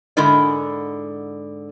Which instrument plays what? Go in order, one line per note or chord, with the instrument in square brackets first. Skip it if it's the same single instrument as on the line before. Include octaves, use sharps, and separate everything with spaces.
[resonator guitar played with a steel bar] G#2 D3 G#3 E4 A#4 D5